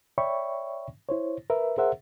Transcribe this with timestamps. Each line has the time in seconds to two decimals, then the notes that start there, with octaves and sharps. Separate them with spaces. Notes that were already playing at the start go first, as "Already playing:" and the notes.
0.18 C#5 D5 E5 G5 B5 C#6
1.09 E4 C5 C#5
1.50 A#4 B4 E5
1.78 G#4 A#4 C5 E5 F#5